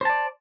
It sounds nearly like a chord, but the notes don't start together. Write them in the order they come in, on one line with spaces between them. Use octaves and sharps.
C5 A5 D5